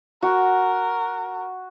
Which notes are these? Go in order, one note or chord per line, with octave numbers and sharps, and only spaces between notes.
F#4 A#4